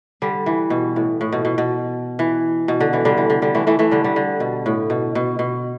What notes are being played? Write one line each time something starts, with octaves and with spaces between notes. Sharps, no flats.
D3 G3
E3
B2
A2
A2
B2
B2
B2
E3
B2
D3
E3
D3 G3
E3
D3
D3 G3
E3 A3
E3 A3
E3 A3
D3 G3
D3 G3
D3
B2
A2
B2
B2
B2